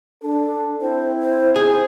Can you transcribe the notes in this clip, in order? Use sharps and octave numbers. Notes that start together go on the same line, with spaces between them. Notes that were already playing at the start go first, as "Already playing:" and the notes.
D4 A4
C4 E4 C5
C5
G#4 C5